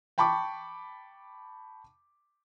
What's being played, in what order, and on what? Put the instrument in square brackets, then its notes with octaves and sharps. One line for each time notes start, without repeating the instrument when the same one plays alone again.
[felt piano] G5 A5 B5 C#6 D6